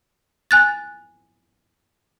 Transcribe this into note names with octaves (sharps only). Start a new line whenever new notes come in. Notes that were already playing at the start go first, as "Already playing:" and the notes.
G#5 F#6 A6